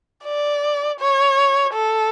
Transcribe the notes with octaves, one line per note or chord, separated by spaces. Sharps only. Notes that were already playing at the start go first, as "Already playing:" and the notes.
D5
C#5
A4